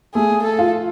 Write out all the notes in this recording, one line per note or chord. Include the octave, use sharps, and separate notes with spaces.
A3 G#4
A4
F4